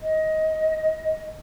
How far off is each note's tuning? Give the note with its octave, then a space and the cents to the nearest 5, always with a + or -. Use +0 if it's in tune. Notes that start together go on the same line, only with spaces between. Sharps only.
D#5 +15